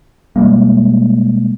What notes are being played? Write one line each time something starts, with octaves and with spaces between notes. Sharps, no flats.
B2 G3 G#3 A#3